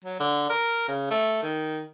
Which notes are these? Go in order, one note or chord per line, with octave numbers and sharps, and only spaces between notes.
F#3
D3
A#4
C#3
A3
D#3